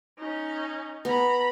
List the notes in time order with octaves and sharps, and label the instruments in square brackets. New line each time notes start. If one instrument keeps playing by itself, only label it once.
[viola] C#4 D#4
[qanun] B3 [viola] A#5 B5